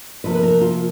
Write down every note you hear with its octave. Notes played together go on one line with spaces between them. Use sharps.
C3 F3 A#3 B4
B4
A#4
F4